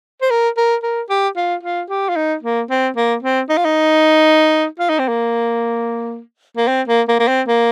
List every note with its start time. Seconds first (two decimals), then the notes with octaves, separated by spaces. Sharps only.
0.21 C5
0.30 A#4
0.57 A#4
0.83 A#4
1.09 G4
1.36 F4
1.63 F4
1.89 G4
2.09 F4
2.16 D#4
2.43 A#3
2.70 C4
2.96 A#3
3.22 C4
3.49 D#4
3.57 F4
3.65 D#4
4.79 F4
4.89 D#4
4.99 C4
5.08 A#3
6.57 A#3
6.67 C4
6.88 A#3
7.08 A#3
7.19 A#3
7.28 C4
7.47 A#3